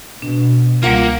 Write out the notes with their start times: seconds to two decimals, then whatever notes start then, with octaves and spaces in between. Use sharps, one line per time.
0.22 B2 D4
0.83 C#2 G3 A#3 F4 F5 F#5